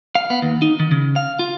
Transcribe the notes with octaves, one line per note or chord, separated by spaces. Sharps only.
F5
B3
D#2
D#4
D#3
C#3
F5
F4